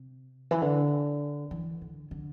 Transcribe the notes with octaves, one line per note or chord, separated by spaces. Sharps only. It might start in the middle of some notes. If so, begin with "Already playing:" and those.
Already playing: C3
E3
D3
E3
D3
D3